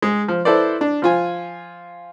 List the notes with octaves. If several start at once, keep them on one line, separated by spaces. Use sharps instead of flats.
G#3
F3
E4 A4 B4 C5 D5
D4
F3 F4 G#5